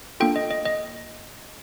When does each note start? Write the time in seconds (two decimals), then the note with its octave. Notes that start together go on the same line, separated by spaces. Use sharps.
0.20 A#3 D4 F4 A4 G5
0.36 D#5
0.51 D#5
0.65 D#5